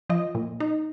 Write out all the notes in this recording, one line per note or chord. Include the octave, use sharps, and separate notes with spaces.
F3 D#5
A#2
D#4